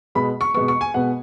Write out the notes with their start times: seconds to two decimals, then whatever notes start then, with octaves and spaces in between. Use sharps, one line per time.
0.15 B2 G#3 B3 B5
0.41 C#6
0.54 B2 G#3 B3 C#6
0.68 C#6
0.81 G#5
0.94 B2 G#3 B3 F#5